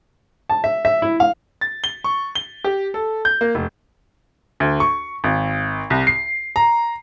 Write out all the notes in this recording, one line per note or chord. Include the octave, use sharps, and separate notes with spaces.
A5
E5
E5
E4
F5
A6
G7
C#6
G7
G4
A4
G6
A#3
F1
D2
C#6
G#1
C2
C7
A#5